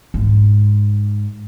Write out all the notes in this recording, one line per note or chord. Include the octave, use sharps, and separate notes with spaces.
G#2